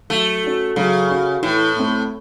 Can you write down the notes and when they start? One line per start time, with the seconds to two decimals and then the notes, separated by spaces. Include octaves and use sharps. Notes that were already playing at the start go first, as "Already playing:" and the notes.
0.10 F#3 A3
0.44 C#4 F#4
0.76 C#3 F#3
1.09 C#4 F#4
1.42 A2 E3
1.76 A3 C4